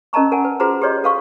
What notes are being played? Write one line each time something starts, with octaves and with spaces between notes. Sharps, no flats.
C#4 A#4 D#5 A5 A#5 C#6
A#4 F#5 G#5
B4
F4 F#4 G#4 B4 C5 A#5
G4 G#4 B4 C#5 D#5 C6
F#4 A4 B4 F5 C6 C#6